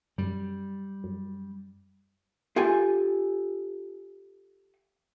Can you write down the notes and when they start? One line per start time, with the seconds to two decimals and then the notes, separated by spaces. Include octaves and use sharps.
0.18 F#2 G3
1.04 F#2
2.56 F4 G4 A4 G#5